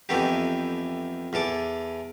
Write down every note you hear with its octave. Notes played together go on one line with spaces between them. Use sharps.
F2 E3 A3 B3 D#4 G4
E2 E3 A4 D6